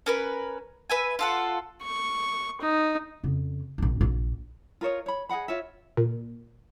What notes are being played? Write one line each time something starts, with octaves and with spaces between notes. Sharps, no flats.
C#4 A#4 B4
B4 E5 G#5
F4 A4 F#5
C#6
D#4
F2 C#3
A#1 D4
A#1
F4 A#4 C#5 D#5
C#5 B5
G#4 D#5 F#5 B5
F4 C#5 E5
A#2